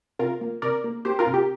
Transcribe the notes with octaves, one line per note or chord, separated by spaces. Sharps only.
C3 F4 A#4
A#3
C3 A#4 D5
A#3
A#3 G4 C5
F4 A#4
C3
G4